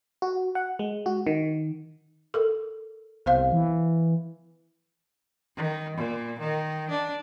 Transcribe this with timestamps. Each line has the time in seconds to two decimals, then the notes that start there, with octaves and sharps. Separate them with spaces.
0.22 F#4
0.55 F#5
0.79 G#3
1.06 F#4
1.27 D#3
2.34 A4 A#4
3.26 C2 B3 C5 F5
3.53 E3
5.56 D#3
5.97 A#2
6.40 D#3
6.90 D4